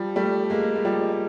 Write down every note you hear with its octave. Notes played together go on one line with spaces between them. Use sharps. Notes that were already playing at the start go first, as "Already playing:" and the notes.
Already playing: F3 G3
G3 A3
G#3 A#3
G#3
F3 G3